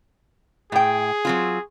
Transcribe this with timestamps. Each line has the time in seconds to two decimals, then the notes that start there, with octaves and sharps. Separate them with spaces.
0.72 A2 G#4 G5
1.25 F#3 C4 F4